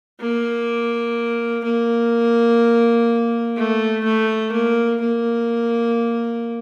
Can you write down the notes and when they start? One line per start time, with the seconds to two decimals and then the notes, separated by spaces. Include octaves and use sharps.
0.20 A#3
1.64 A#3
3.57 A3
4.04 A3
4.52 A#3
5.01 A#3